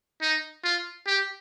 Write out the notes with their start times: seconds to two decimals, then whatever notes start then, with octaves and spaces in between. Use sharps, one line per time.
0.22 D#4
0.64 F4
1.07 G4